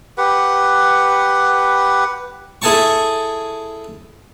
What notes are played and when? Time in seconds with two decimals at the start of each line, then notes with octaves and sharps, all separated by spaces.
0.18 G4 B4 F#5
2.62 E4 G#4 A4 G#5 A5 C#6